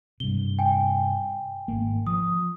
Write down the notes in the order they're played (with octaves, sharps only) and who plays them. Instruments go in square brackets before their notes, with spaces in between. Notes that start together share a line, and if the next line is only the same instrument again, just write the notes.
[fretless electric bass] G2 C3 [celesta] G7
[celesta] G5 G#5
[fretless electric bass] G#1 A#3
[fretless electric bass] F3 [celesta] D#6